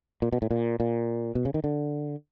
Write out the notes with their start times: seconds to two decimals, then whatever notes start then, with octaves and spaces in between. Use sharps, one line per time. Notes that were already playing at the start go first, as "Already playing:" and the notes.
0.22 A#2
0.32 B2
0.42 A2
0.51 A#2
0.80 A#2
1.35 B2
1.45 C#3
1.54 D#3
1.64 D3